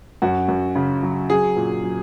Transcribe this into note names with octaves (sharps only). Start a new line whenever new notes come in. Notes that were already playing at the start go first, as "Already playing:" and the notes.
F#2 F#4
F#2
C#3
F#3
F#3 G#4
A#2
F#3